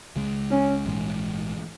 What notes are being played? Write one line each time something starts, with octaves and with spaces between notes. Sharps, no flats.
C#2 C#3 G#3
C#4
A#1 G#2 E3 G#3